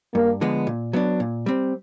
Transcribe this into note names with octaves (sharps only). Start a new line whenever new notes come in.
G2 A#3
D3 F3 G#3 B3
A#2
F#3 B3 D4
A#2
G3 C4